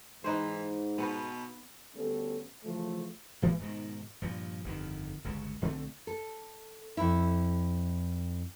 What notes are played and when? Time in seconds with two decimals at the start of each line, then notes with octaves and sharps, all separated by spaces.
0.24 G#2 E3 D#4 B4 C5
0.98 B2 B3
1.95 D2 G3 B3 C#4 A4
2.64 C#3 E3 F3 A3
3.42 A#1 E3 G#3 A#3
3.59 G#2 B2 D#3
4.22 G2 A#2 F3
4.64 G1 F2 D#3
5.24 G1 C#2 C#3
5.61 B1 D3 A3 C4
6.07 A4
6.97 F2 E4